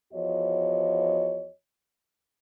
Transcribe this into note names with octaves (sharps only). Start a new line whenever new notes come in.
E2 F3 F#4 C#5 D#5